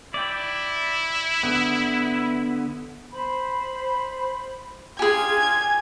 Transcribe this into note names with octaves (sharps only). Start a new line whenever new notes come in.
E4 D5 G5
D3 B3
C5 B5
F4 G4 G#4 G#5 G#6